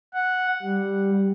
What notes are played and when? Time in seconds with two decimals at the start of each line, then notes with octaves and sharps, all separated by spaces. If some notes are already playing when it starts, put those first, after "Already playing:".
0.14 F#5
0.62 G3